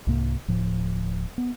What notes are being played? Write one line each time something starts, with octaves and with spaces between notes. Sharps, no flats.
C2 G#2 C3 A#3
D1 A2 F3
B3